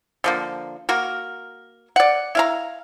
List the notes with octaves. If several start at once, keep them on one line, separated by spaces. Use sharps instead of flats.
D3 F3 A#3
A#3 F#4 A#4
D5 F#5
E4 F5 A#5